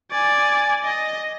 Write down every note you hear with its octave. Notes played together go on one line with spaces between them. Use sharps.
D5 G#5
D#5